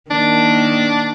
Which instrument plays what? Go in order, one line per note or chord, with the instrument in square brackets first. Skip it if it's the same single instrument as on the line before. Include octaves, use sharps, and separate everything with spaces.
[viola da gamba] D#3 A#3 [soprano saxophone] D4